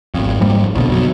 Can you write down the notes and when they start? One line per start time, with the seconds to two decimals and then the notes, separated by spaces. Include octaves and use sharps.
0.14 G#1 F2
0.41 G#2 F3 G3 A#3
0.75 A#1 F2 B2 D3
0.91 B2 F#3